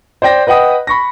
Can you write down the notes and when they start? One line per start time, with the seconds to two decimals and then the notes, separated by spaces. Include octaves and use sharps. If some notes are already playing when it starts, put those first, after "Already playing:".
0.22 C5 D5 G5 A#6
0.47 B4 D#5 F#5 G5 D#6
0.87 B5 C#6 A#6